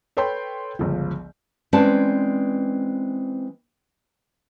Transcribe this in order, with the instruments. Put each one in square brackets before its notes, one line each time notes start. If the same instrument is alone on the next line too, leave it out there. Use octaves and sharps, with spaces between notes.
[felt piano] A4 B4 C#5 G5 C6 G6
G1 C#2 F3
[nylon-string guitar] E3 G#3 C4 C#4 D5 A5